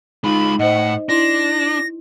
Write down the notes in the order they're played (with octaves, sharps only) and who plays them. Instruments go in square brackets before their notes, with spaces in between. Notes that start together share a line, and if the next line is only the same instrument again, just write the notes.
[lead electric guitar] G#3 F4 [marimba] D#4 [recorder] B5
[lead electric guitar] A2 [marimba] C5 D#5 [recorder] F#5
[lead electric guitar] D4 [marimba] E4 C6 [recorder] A#6